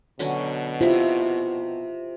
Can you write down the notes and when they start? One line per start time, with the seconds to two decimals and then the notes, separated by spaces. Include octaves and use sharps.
0.19 B2 D3 F#3 C#4
0.81 C3 E4 F4